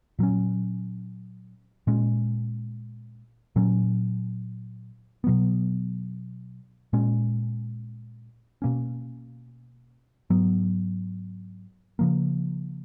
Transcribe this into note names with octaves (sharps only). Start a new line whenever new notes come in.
A#2 F#3 C#4
A#2 G#3 C#4
A#2 F#3 C#4
B2 F#3 B3
A#2 G#3 C#4
B2 A#3 C#4
G#2 F#3 B3
C#3 F3 A#3